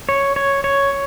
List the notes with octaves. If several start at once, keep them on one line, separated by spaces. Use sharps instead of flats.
C#5
C#5
C#5